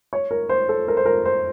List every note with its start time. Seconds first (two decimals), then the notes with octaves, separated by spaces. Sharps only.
0.13 C#5
0.31 A#4
0.49 C5
0.69 A4
0.88 A#4
0.97 C5
1.06 A#4
1.25 C5